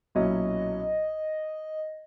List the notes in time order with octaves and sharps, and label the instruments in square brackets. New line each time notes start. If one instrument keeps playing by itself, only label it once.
[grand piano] B1 A#2 F#3 C#4 E4 [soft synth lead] D#5